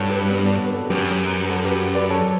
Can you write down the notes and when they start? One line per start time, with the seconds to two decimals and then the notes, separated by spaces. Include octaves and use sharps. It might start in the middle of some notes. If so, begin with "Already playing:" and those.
Already playing: G2 F#4 A4 C#5
0.09 G4 B4
0.29 B3 D4
0.44 B3 D4
0.66 B4
0.74 F#4 A4
0.89 F#2 G4 B4
1.45 B4
1.50 F#4 A4
1.65 G4 B4
1.95 B4 D5
2.10 A4 C#5